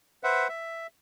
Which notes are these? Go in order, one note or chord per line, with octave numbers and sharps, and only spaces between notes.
B4 C5 E5 F#5
E5